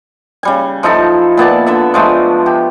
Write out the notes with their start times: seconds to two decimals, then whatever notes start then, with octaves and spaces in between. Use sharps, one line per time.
0.43 C#3 G3 G#5
0.83 F3 D#4 E4 A4
1.37 A#2 B3 D5 A5
1.67 D3 A4 E5
1.94 F3 G#3 A3
2.46 G4